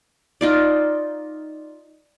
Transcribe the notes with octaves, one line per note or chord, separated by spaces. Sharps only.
D#4 F4 D5